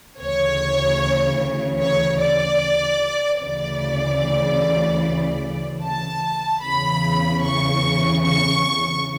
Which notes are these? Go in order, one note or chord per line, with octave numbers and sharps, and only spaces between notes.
D2 C#3 E3 C#5
C#5
D5
D2 C#3 E3 D5
A5
E2 C#3 E3 B5
C#6
C#6